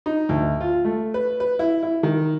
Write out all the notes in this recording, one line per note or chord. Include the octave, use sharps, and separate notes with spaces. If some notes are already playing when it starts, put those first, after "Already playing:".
D#4
D2
F4
A3
B4
B4
E4
E4
D#3